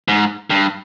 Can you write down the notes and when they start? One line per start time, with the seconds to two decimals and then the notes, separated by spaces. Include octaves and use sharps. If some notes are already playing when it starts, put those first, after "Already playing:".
0.08 G#2
0.50 G2